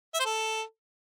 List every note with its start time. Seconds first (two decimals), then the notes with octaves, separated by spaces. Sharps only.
0.14 E5
0.20 C5
0.25 A4